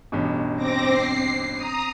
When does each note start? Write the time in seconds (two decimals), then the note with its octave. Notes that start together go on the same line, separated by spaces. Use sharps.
0.12 A1 G2 B2
0.56 C4 D6 A#6
0.89 C7
1.55 A#5 D#6